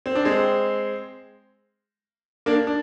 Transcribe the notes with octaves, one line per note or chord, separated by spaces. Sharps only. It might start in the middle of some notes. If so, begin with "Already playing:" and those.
C4
D4
G#3 C4
A#3 D4
D4